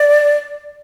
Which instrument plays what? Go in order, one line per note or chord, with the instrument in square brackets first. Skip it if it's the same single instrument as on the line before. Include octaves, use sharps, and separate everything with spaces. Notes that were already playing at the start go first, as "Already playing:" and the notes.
Already playing: [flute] D5